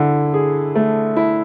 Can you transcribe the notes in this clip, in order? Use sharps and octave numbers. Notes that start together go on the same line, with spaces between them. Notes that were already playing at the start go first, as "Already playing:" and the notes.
Already playing: D3 E4
G#4
A3
E4